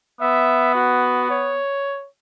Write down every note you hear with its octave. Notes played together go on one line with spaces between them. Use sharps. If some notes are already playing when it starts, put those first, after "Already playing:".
B3 E5
F#4
C#5